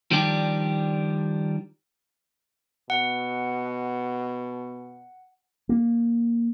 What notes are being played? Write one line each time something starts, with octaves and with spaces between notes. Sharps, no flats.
D#3 F3 G3 D4 G4
B2 F#5
A#3